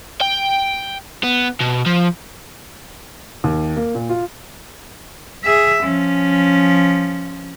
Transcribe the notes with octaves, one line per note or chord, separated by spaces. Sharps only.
G5
B3
B2
F3
D#2
A#3
A#2
F4
G#4 E5
F3 C#4